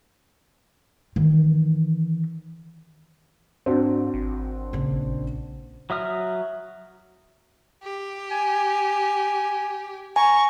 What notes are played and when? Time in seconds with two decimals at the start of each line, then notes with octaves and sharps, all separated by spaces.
1.16 D#3 E3
3.66 G#2 C4 D4 F#4
4.14 G#1
4.73 A#1 C#3
5.90 F#3 E5 D#6 F6
7.83 G4
8.31 G#5
10.16 G#5 A#5 C#6